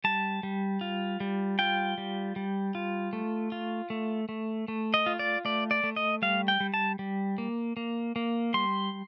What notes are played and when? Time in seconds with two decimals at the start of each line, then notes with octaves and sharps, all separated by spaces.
0.04 G3 A5
0.43 G3
0.81 F4
1.20 G3
1.59 F4 G5
1.98 G3
2.36 G3
2.75 F4
3.13 A3
3.52 F4
3.90 A3
4.29 A3
4.68 A3
4.94 D#5
5.06 F4
5.19 D5
5.45 A3 D5
5.71 D5
5.84 A3
5.96 D#5
6.22 G3 F5
6.48 G5
6.60 G3
6.74 A5
6.99 G3
7.38 A#3
7.77 A#3
8.16 A#3
8.54 G3 C6